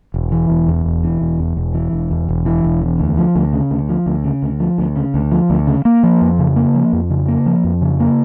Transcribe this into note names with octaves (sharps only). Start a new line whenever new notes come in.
E1
E3
E1
E2
E1
E3
E1
E2
E1
E3
E1
E2
E1
E3
E1
E2
D2
F3
D2
C#3
D2
F3
D2
C#3
D2
F3
D2
C#3
D2
F3
D2
C#3
A#3
F3
F2
C#3
A#3
F3
F2
C#3
A#3
F3
F2
C#3
A#3